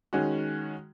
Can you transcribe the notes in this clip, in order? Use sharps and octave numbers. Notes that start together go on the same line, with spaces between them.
D#3 G#3 C#4 F#4